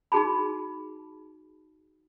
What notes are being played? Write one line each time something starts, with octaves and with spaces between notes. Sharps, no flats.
D#4 F#4 G#4 A5 B5